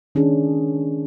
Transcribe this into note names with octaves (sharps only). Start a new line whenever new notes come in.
D#3 C#4 D4 G#4